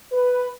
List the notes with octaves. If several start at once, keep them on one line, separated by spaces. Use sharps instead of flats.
B4